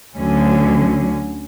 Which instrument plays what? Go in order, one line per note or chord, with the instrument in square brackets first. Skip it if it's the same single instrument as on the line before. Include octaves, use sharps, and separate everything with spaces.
[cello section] D2 D3 F#3 C#4